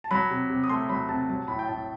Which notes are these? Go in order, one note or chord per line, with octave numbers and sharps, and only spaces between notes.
A5
F#3 B5
C3
C3
D#6
A3 C6
F#3 B5
C3 A5
F#3 A5
A2 B5
G5
A2 A5